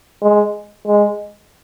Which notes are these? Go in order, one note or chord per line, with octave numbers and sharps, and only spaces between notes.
G#3
G#3